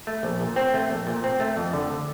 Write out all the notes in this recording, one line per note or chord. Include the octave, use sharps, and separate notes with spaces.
A3
A#1
A#2
C4
A3
A#1
A#2
C4
A3
F2
D3